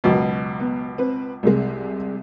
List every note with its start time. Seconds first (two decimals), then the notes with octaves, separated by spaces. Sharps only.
0.04 C#2 F#2 B2
0.60 B3
0.98 C4 B4
1.43 C2 C3 G#3